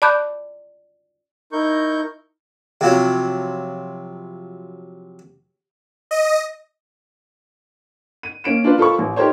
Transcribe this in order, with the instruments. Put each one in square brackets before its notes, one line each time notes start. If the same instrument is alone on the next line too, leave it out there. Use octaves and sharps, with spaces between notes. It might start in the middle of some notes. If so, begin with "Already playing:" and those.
[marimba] D5 A5 B5 D6 F#6 G6
[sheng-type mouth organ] D#4 E4 A#4 C#6 G6
[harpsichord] C3 F3 F#3
[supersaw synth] D#5
[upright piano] D#7
A#3 C#4 D7 E7
D4 F4 B4
F4 A4 A#4 C5 B5 C#6
A1
D#4 G4 A4 A#4 C5 C#5